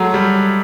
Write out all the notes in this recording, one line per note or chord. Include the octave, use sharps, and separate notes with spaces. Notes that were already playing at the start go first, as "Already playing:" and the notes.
Already playing: F#3 G#3 A3
G3